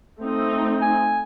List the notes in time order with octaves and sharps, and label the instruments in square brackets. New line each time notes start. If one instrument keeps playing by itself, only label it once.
[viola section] A3 C4 D#4
[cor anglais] G#5